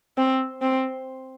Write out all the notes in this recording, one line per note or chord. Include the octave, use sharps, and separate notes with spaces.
C4
C4